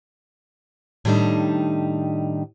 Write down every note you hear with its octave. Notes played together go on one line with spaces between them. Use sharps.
A2 D#3 G3 D4 D#4